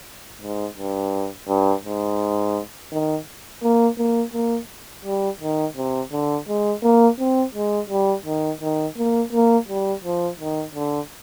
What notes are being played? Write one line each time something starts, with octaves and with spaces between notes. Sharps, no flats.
G#2
G2
G2
G#2
D#3
A#3
A#3
A#3
G3
D#3
C3
D3
G#3
A#3
C4
G#3
G3
D#3
D#3
A#3
A#3
G3
F3
D#3
D3